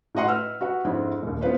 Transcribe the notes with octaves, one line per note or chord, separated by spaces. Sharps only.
A2 F#4 D#5 F#5 C6
B4 E6 F6
F#4 B4 F#5
F2 G#2 C4 D4 E4
A#1 D#2
B3 E4 F4 B4 C5